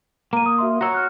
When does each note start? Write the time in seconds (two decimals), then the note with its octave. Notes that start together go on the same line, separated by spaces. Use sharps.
0.33 A#3 A#5 D#7
0.46 D#6
0.58 F#4 E5 C6
0.81 F#4 C#5 A#5 E6
0.94 F6 F#6